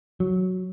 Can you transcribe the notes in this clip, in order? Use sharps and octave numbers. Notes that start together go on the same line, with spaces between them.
F#3